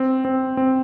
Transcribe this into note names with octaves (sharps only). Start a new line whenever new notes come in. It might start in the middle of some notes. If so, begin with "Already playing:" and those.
Already playing: C4
C4
C4